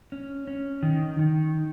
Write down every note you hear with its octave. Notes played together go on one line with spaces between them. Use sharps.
C#4
C#4
D#3
D#3